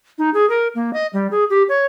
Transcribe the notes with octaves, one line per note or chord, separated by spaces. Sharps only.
D#4
G#4
A#4
A#3
D#5
G3
G#4
G4
C#5